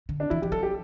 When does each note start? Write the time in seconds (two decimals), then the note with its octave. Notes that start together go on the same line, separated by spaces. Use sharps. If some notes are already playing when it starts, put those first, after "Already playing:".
0.09 D3
0.20 D4
0.30 E3 E4
0.42 E3 G4
0.52 F#3 A4
0.63 G4